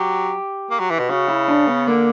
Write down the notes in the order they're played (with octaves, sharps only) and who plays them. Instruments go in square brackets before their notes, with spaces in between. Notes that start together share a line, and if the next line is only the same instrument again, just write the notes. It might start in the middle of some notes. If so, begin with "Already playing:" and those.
Already playing: [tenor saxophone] F#3 [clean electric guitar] G4
[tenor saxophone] A#3
F#3
E3
B2
[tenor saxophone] C#3 [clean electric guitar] F#4
[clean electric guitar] E4
D4
B3
[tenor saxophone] D3 [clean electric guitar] A#3